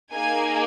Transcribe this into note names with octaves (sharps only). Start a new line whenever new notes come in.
A#3 D#4 G#4 G#5